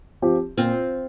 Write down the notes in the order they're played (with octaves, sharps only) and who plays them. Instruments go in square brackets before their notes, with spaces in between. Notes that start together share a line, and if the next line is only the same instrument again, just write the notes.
[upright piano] F3 C4 G4
[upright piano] A#2 [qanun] C4 F4